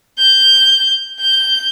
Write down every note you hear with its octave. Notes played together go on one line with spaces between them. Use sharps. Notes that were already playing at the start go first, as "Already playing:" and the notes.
G6
G6